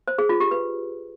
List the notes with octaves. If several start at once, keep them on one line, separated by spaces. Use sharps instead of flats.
C5
G#4
F4
G4
B4